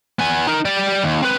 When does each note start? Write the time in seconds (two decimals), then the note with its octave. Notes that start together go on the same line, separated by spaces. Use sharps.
0.19 B3 G#5
0.47 D#4 A#4
0.65 G3 D5
1.04 D#2
1.22 C4 B4